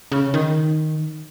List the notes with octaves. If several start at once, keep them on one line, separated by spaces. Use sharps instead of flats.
C#3
D#3